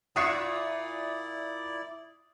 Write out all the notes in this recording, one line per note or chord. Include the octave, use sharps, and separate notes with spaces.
A#2 E4 F4 D5 E5 D#6 C7 C#7